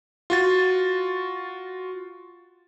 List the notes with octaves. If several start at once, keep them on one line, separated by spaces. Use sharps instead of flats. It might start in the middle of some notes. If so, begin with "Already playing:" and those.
F4 F#4 A6